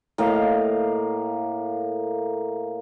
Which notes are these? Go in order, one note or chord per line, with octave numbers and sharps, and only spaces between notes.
A2 A#3 D#5 F5